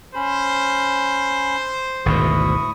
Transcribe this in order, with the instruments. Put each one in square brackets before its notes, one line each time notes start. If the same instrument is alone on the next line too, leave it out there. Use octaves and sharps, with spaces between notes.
[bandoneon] C#4 B5 [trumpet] C5
[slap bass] G#1 D2 B2 [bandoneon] E4 C#6 D#6